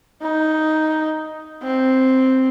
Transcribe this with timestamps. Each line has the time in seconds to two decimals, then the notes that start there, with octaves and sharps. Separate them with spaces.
0.22 D#4
1.62 C4